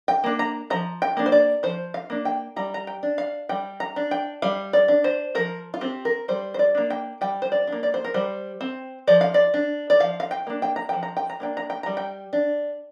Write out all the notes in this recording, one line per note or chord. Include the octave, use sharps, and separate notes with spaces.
G5
A#3 D4
A#5
F3 A#5
G5
A#3 D4
C5
D5
F3 C5
F5
A#3 D4
G5
G3 A#5
A#5
G5
D4
F5
G3 G5
A#5
D4
G5
G3 F5
D5
D4
C5
F3 A#4
F4
C4 G4
A#4
G3 C5
C5
D5
A#3 D4
G5
G3 G5
C5
D5
D4
A#3
D5
C5
A#4
G3 C5
C4
F3 D5
F5
D5
D4
D5
F3 F5
F5
G5
A#3 D4
G5
A#5
F3 G5
A#5
G5
A#5
A#3 D4 G5
A#5
G5
G3 A#5
G5
D4